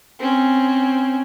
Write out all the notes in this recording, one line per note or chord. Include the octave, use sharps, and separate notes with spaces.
C4 C#4